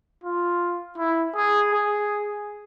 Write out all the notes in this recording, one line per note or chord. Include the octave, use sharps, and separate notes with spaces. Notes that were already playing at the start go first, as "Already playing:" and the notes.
F4
E4
G#4
G#4